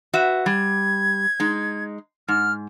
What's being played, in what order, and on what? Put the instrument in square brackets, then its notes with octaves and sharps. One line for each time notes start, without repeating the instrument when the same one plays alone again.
[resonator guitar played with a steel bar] F#4 B4 E5
[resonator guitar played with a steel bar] G3 [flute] G#6
[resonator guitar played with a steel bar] G#3 D#4
[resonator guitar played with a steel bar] G#2 [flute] F6